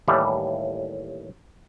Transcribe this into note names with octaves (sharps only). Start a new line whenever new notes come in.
D#2 A2 E3 G3